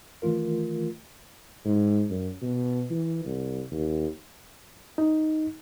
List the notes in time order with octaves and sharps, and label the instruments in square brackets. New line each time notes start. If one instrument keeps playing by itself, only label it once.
[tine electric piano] D#3 E3 A3 F4 A#4
[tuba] G#2
F#2
B2
E3
C2
D#2
[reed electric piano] D#4